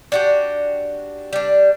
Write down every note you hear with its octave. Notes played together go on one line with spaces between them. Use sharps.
D4 F#4 G4
G3 D4